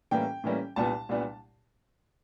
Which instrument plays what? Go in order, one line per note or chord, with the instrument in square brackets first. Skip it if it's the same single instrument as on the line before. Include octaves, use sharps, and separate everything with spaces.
[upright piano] A2 E3 G3 A#3 C#4 G5
A2 E3 G3 A#3 C#4
C2 A#2 G3 B3 D4 A5
C2 A#2 G3 B3 D4